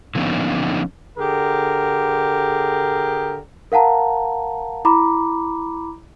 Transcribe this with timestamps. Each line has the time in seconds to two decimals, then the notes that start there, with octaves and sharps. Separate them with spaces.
0.15 D3 F3 A#3 B3 C#4 D#4
1.18 D3 G4 G#4 A#4
3.72 A#4 F5 F#5 A5 A#5
4.85 E4 A#5 B5 D6